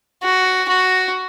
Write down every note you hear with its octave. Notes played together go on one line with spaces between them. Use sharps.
F#4
F#4